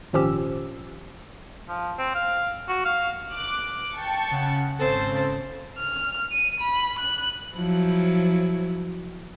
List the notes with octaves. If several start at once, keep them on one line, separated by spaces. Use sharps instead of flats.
G#1 A#2 F3 C#4 G4 E6
F3
C4
F5
F#4
F5
D6 F#6
G5 A5 C#6
C#3 F#5
G#1 C#3 C4 A4 C5 A5
F6
D#7
B5
F#6
F3 F#3 E4